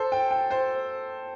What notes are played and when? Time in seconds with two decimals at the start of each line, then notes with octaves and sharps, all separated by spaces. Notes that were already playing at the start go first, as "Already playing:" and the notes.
Already playing: A4 C5
0.12 G5
0.31 G5
0.51 C5